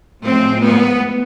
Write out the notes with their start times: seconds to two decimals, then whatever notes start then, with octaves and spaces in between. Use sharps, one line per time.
0.24 A2 F3 G#3 C4
0.63 B3